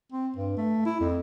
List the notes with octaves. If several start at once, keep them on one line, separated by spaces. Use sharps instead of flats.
C4
G2
A3
E4
F2